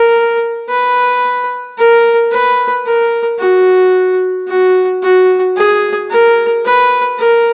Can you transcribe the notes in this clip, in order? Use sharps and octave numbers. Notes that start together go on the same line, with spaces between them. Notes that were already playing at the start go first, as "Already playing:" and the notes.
Already playing: A#4
B4
A#4
B4
A#4
F#4
F#4
F#4
G#4
A#4
B4
A#4